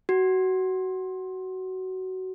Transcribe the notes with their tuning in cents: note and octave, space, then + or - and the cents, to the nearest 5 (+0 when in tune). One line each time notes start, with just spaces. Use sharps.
F#4 +20